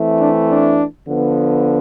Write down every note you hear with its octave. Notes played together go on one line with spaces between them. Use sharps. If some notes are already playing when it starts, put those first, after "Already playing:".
Already playing: E3 A3 C4
D4
D4
D3 F3 B3